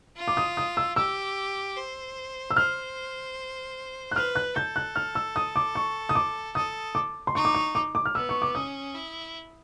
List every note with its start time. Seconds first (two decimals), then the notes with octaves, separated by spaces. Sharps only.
0.17 F4
0.28 D6
0.37 D#6
0.57 D#6
0.77 E6
0.96 G4 E6
1.76 C5
2.50 E6
2.56 C5 F6
4.11 F#6
4.16 B4 F6
4.35 F#6
4.55 A4 G6
4.76 F#6
4.96 F6
5.15 E6
5.36 D#6
5.56 D6
5.75 C#6
6.09 D#6
6.15 D6
6.55 A4 D#6
6.95 D6
7.27 C6
7.35 D#4 C#6
7.45 D6
7.55 C#6
7.75 D6
7.95 D6
8.05 F6
8.15 B3 E6
8.29 C#6
8.42 D6
8.55 C#4 D#6
8.94 E4